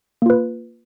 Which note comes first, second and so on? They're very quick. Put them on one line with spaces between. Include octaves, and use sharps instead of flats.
A#3 F4 B4